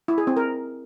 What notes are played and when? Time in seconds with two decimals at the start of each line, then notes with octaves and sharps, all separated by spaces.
0.08 E4
0.18 G#4
0.27 C4
0.37 A#4